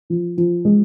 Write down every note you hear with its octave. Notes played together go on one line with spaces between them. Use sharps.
F3
F3
G#3